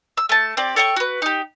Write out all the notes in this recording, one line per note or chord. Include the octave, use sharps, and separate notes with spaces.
E6
A3 A5
C4 G4 D5
A4 C#5 G5 C#6
F#4 B4
D#4 G4